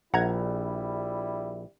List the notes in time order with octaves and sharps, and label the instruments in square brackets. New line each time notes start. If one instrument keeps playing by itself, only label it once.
[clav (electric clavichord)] A#1 [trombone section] G3 E4 [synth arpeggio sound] F#5 A#5 G#6